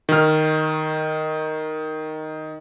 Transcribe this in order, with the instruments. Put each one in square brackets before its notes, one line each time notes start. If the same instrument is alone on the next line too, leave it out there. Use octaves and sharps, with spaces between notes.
[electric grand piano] D#3 F6